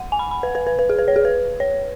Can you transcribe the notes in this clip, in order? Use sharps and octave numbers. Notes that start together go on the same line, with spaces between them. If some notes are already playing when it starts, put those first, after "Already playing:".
Already playing: F#5
G#5
B5
B5
B4
B4
B4
B4
G#4
B4
C#5
G#4
B4
C#5